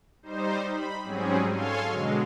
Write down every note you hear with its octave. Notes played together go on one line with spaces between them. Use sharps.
G3 D#4 C5
B5
G#2 F#3 G3 C4 C#4 G#4
A4 C#5 F5 G#5 C6
B2 D3 F#3 G#3